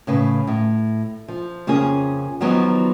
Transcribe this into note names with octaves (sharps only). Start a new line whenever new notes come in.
A2 C#3 B4
A2
F3
F2 C#3 A#3 C#4 G#4
D#3 F3 F#3 G#3 B3